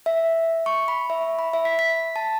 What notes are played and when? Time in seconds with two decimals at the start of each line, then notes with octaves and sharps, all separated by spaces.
0.06 E5
0.66 C#6
0.88 B5
1.10 E5
1.39 B5
1.53 E5
1.65 B6
1.79 B6
2.16 A5